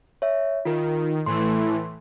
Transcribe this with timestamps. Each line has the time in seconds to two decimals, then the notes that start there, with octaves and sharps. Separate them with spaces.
0.22 C#5 E5
0.65 D#3 F4 A#4
1.26 A2 E3 A3 C6